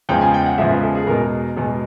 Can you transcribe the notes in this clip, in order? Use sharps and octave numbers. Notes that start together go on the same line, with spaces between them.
E2 C#3 F3 G#3 G5
G#5
G5
F#5
E2 C#3 F3 G#3 E5
B4
A4
G#4
E2 B2 G#3 A#4
E2 B2 G#3